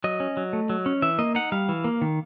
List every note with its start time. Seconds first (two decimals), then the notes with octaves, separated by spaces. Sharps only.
0.04 F#3 D#5
0.20 C#4
0.37 F#3
0.53 A3
0.69 F#3
0.86 C#4
1.02 E3 E5
1.19 A#3 D#5
1.35 D#4 F#5
1.52 G3 F5
1.69 E3
1.84 A#3
2.01 D#3